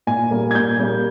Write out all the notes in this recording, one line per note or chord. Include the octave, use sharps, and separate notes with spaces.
A#2 G#5
G3 A#3
G#6
A#2 G6
G3 A#3